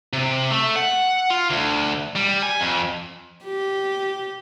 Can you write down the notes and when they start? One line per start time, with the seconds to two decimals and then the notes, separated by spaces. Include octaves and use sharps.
0.13 C3
0.51 A3
0.76 F#5
1.30 F4
1.50 D2
2.16 G3
2.42 G#5
2.60 F2
3.44 G4